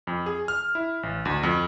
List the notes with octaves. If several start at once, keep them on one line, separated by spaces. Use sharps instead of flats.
F2
G#4
F6
E4
A1
D2
F2